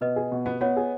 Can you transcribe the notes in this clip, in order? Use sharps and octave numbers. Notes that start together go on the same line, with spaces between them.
B2 B4 D#5
G#4
B2
B3
B3 C#5 F#5
G#4